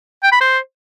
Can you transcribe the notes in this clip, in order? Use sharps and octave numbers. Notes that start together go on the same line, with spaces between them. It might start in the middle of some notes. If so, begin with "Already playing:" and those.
G5
B5
C5